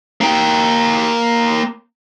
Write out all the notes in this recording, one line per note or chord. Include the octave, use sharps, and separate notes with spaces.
A#3 G5